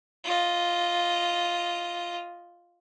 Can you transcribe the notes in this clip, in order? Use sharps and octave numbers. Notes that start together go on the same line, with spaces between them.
F4 D#5